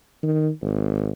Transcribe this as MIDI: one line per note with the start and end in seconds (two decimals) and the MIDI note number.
0.23 0.49 51
0.62 1.10 32